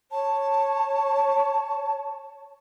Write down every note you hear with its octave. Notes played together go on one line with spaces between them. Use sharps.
C#5 A5